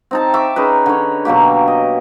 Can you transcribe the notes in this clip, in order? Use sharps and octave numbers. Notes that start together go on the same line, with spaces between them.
C4 D#4 A5
E5 C#6 D6
C#4 D#4 G#4 B4
D3 C#5
B2 F#3 A#3 G4
D#5